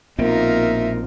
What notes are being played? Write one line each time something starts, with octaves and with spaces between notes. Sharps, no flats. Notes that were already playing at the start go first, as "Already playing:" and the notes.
A#1 B2 A#3 C4 D#4 F4 A#4 E5